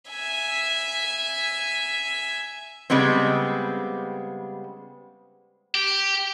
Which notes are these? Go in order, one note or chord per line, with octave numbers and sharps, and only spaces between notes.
E5 G#5
C#3 G3 G#3 B3 C4
G4